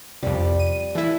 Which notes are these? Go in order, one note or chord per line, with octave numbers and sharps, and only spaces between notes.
C2 F2 G3
D#7
E3 E4 A4